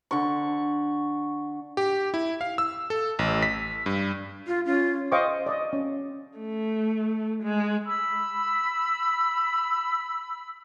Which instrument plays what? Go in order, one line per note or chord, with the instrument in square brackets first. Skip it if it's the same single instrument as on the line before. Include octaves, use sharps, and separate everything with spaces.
[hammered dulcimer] D3 C#6
[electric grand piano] G4
E4
F5
E6
A4
A1
B6
G2
[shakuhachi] F4
[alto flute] C#4 [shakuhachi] F4
[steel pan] C5 D#5 F5 G5 C#6 D6
D5 D#5
C#4
[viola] A3
G#3
[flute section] B5 E6